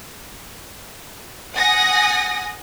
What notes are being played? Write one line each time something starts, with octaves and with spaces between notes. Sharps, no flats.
F#5 G#5 D#6 A#6